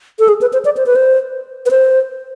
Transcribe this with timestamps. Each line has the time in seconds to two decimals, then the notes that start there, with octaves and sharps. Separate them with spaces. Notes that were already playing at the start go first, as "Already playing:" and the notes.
0.19 A4
0.28 G#4
0.41 B4
0.53 C5
0.65 D5
0.77 C5
0.86 B4
0.96 C5
1.66 B4
1.71 C5